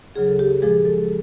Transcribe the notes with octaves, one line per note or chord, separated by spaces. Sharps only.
D2 C#3 F#3 G#4
A4
G4
A#2 F3 G#3 G#4
A4